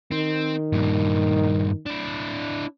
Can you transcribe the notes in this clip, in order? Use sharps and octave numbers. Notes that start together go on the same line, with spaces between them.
D#3 C4
G2 A#2
D4 E4